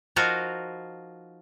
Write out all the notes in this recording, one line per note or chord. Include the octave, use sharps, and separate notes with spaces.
F3 D#4 F4 F#4 A#4 F5